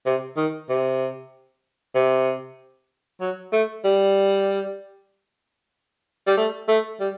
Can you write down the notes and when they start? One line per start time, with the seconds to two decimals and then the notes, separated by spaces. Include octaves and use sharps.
0.06 C3
0.37 D#3
0.69 C3
1.95 C3
3.20 F#3
3.52 A3
3.85 G3
6.27 G3
6.37 A3
6.68 A3
7.00 G3